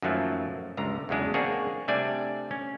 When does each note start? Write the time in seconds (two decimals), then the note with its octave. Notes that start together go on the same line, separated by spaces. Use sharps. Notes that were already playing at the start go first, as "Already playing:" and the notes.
0.02 F#2 D#3 F3 F#3 A3 A#3
0.77 G1 C#2 D3 A#5
1.09 E2 G#2 C#3 F#3 G#3 D4
1.34 A#3 C4 D4 G#4 C#5 F#5
1.88 C3 G3 A3 D4 D5 G#5
2.51 C#4